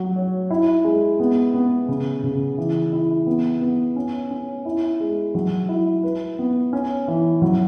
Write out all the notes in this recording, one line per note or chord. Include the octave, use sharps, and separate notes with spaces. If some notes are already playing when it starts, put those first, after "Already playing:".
Already playing: F#3
C#5
E4
G#3
B3
B3
C#3
C#3
E3
E4
B3
B3
C#4
C#4
E4
G#3
F#3
E4
B4
B3
C#4
E3
F#3